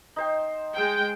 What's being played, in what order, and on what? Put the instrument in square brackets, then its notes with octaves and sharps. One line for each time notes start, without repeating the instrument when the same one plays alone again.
[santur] D#4 C5 G5
[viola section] G#3 G5 [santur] E6